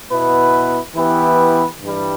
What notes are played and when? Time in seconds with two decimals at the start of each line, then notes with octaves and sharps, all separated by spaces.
0.10 B2 B3 E4 B4
0.95 E3 B3 E4 G4 B4
1.81 G2 E3 G3